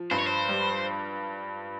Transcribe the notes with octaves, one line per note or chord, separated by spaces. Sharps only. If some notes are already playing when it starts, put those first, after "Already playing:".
Already playing: F3
G2 C5
C#5
C5
G3